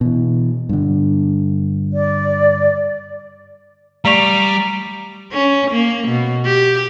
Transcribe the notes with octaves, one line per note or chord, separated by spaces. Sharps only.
B2 E3
G2 D3
D5
G3 A3 D5 A#5 C#6 B6 F7
C#4
A#3
B2
G4